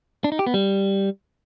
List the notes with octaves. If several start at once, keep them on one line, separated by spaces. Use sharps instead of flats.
D4
D#4
G4
B3
G3